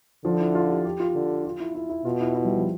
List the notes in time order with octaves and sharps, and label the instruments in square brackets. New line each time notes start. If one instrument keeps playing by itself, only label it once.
[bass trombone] D3 [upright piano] F3
[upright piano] E4
F4
G4
G4
F4
[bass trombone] D3
[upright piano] F4
E4
E4
E4
[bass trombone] B2 [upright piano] F4
[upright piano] E4
E4
G3
F3